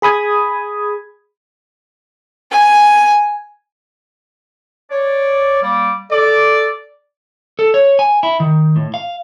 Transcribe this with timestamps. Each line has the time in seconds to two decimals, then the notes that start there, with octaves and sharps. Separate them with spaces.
0.02 G#4 B5 D#6 G#6
2.51 G#5
4.90 C#5 D5
5.62 G3 A#3 D5
6.11 A4 D5 D6
7.59 A4
7.74 C#5
7.99 G#5
8.23 E4
8.40 D#3
8.76 A2
8.94 F5